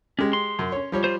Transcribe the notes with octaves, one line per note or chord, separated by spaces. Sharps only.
G#3 C#4 G4
C6
F#2
C#4 C#5
F3 G3 C#5
F4 C5